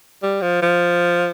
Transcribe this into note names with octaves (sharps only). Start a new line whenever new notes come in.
G3
F3
F3